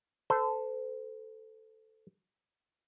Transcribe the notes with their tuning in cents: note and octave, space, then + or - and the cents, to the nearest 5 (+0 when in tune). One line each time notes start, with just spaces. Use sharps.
A4 +0 C5 -30